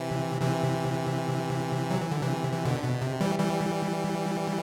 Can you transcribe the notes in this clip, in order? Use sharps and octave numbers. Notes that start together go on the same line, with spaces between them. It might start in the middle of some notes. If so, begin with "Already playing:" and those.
Already playing: C3 E3
C3 E3
F#3
E3
D3
C3 E3
E3
B2 D3
B2
C3
E3 G3
E3 G3